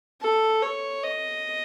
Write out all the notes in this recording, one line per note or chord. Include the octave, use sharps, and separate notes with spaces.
A4
C#5
D#5